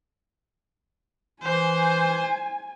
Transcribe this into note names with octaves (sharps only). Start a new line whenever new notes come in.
E3 C5 G#5